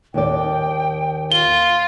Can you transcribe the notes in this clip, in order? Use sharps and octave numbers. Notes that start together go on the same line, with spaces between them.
D#2 D5 G5
F4 G7